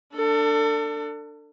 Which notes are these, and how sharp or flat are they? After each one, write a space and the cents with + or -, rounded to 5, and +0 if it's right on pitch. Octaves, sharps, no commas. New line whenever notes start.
D4 +5 A4 +30